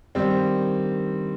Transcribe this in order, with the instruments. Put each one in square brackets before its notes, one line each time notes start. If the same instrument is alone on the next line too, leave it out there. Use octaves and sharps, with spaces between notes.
[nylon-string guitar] G2 D#3 A#3 D#4 [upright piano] G3 C4